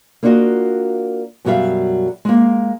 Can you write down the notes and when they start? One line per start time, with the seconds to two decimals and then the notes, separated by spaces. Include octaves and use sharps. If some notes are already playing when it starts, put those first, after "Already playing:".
0.23 A#3 D4 F4 F#4 D#5
1.45 F#2 B2 F#3 G3 E5 F5
2.25 G#3 A#3